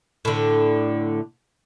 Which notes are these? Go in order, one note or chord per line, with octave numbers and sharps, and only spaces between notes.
A2 D3